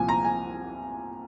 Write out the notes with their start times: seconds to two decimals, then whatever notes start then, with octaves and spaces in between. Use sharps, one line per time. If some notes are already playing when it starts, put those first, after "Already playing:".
Already playing: C2 A#2 F3 G#5
0.09 A#5
0.24 G#5